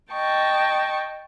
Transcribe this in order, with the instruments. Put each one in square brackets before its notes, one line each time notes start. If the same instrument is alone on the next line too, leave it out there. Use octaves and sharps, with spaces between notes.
[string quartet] D#5 G5 A5 C#6